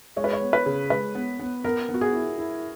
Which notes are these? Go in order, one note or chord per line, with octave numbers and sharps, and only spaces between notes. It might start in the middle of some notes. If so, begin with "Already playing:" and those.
G#3 C#5
B4
C#5
B3
B4
C#3
G#3 B4
B3
B3
B3 A#4
B3
F#4
G#4
E4
E4